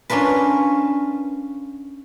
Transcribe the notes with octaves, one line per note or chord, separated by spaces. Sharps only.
C#4 D4 F4 A#4 B4